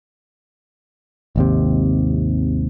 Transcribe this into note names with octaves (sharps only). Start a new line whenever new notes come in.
G#1 D#2 C3